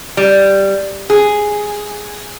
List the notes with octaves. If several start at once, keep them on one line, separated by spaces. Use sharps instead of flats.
G3
G#4